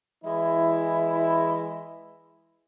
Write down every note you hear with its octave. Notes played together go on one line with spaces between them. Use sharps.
E3 G#3 E4